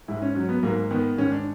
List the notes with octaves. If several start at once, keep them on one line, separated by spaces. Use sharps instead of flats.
G#2 E4
C#4
F#3 C#4
B3
G#2 A#3
D#3 B3
G#2 C#4
D4